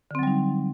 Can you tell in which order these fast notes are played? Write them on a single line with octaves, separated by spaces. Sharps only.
D3 C4 F#3 G3 D#4